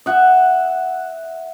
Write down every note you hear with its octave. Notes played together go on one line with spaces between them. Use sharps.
E5 F#5